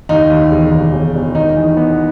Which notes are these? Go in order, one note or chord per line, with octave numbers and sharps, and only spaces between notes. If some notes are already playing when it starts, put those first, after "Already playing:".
D#2 D#4
D#2
E1
D#2
E1
E1
D#3 D#4
E2
B3